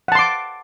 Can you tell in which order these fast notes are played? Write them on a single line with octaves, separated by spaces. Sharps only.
F#5 A5 C6 D6